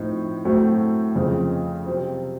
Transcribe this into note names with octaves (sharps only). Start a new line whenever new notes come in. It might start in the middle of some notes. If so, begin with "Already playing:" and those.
Already playing: A2 F3 C4 D#4
A2 F#3 A3 C4 F#4
F2 C#3 F3 C4
C3 F#3 C4